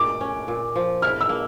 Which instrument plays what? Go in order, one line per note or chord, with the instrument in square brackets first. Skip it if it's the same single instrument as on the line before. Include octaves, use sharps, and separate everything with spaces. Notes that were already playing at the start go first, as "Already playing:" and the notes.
Already playing: [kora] A#2 A3 [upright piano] D6
[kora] C#4
A#2
F3
[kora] E4 [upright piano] F6
[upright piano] E6
[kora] A#3